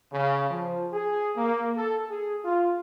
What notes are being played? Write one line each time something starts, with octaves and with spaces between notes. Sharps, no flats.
C#3
F3
G#4
A#3
A4
G#4
F4